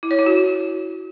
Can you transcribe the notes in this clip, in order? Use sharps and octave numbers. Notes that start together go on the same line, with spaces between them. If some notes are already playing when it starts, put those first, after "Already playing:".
E4
C#5
E4
F#4